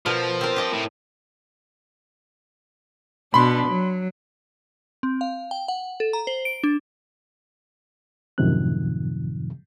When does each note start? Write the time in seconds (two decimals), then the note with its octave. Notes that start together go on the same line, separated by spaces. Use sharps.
0.06 B2 F3 A#4
0.41 C4 A#4
0.56 G4 D#5
0.73 A2
3.34 B2 D4 B5 C6
3.67 F#3
5.03 C4
5.21 F5
5.51 G5
5.68 F#5
6.00 A4
6.13 A#5
6.27 C5
6.45 D7
6.64 D4
8.38 F#2 A2 C3 D#3 F3 F#6